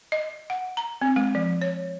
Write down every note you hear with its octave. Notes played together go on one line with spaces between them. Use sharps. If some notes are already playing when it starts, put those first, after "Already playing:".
D#5
F#5
A#5
C4
G#3
F3
C#5